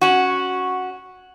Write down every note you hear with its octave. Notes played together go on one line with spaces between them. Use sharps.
C#4 F#4